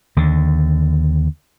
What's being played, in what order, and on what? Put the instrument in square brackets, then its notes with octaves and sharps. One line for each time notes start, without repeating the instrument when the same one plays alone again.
[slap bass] D#2 D3